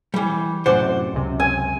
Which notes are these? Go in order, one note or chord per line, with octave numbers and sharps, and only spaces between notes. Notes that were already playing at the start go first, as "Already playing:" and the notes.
E3 G3
F#2 A2 C3 C5 D5 F#5
C#2 F#2 C3
G#5